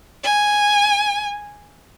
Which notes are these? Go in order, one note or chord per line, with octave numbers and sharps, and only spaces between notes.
G#5